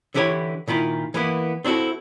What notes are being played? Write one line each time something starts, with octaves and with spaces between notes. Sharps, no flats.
D3 E3 E4 G4 A#4 C#5
A#2 D#3 E4 F4
E3 A#3 B3 E4
C4 D4 E4 F#4 A4